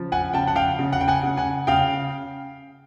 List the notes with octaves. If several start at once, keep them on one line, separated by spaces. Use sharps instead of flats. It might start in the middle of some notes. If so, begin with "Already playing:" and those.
Already playing: C#3 F3
F#5 G#5
C#3 G5 A5
F#5
F5 G5
C#3
F#5
G5
F#5 G#5
C#3
F#5 G#5
C#3 F5 G5